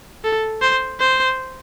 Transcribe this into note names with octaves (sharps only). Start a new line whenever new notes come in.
A4
C5
C5